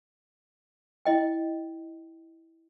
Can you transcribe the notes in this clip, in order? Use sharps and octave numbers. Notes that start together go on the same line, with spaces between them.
E4 D#5 G5